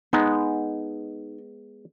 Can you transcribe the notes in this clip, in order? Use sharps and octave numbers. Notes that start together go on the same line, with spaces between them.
G#3 B3 D#4